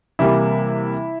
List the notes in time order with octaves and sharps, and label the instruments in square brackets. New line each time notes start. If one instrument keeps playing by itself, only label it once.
[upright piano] C3 E3 G3 A#3 E4